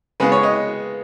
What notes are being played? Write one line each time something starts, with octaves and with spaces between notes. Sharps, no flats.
C#3 G#3 B3 B4
C#5
D#5